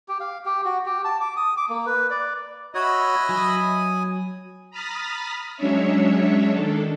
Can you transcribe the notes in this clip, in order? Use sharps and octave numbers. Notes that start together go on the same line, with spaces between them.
G4
F5
G4
F#4
G4
A5
D6
D#6
D6
A#3
B4
D5
F#4 C#5 D#5 E5 B5
F#3 G#5 D#6
A#5 B5 D#6 F6 A6 B6
F#3 G#3 C#4 D4 C#5 E5
D#3 D4 A4